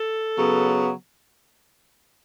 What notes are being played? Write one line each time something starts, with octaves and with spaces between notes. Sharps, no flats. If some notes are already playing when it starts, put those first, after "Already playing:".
Already playing: A4
C#3 F#3 B3